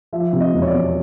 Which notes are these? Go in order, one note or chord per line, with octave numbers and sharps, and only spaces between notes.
F3 E5
C3
D#5
E1
C#5
D5
E2